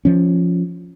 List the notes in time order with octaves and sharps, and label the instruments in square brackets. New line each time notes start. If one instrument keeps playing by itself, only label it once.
[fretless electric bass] F3 C#4